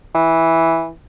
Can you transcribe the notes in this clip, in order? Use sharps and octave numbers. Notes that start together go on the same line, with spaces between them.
E3